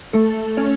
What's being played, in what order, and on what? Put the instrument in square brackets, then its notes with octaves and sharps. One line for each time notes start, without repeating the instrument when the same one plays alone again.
[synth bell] A3 A4
C#4 C#5